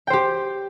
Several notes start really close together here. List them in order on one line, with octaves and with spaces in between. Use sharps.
G5 C5 G4